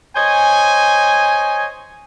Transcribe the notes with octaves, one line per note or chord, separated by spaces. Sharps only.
C5 C#5 D#5 G#5